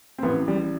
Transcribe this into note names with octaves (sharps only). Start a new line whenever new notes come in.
C4
A1 B3
G3